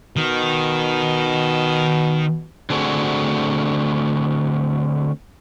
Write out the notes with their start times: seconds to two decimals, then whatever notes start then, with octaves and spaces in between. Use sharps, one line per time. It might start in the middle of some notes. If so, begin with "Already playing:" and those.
0.17 B2 D#3
2.70 D3 F#3 A3 C4 F#4 G#4